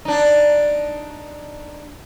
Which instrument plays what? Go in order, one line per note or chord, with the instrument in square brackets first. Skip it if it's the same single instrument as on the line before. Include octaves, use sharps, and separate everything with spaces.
[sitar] D4 D#4